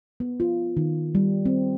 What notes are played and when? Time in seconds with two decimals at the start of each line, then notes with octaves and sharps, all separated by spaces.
0.20 B3
0.40 F4
0.77 D#3
1.15 G3
1.46 C4